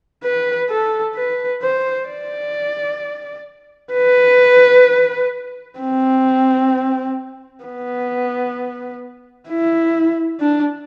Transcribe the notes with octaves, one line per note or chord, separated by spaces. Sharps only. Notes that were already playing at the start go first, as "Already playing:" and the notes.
B4
A4
B4
C5
D5
B4
C4
B3
E4
D4